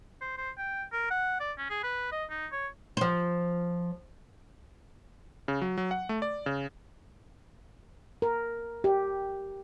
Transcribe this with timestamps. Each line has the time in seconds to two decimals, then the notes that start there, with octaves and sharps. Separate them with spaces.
0.21 C5
0.38 C5
0.58 G5
0.92 A#4
1.10 F#5
1.40 D5
1.58 C#4
1.70 G#4
1.83 B4
2.12 D#5
2.30 D#4
2.52 C#5
2.97 F3 C5
5.48 C#3
5.61 F#3
5.78 F#3
5.91 F#5
6.09 A3
6.22 D5
6.46 C#3
8.22 A#4
8.84 G4